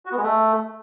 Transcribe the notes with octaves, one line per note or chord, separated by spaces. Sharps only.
F#4
B3
G#3
A3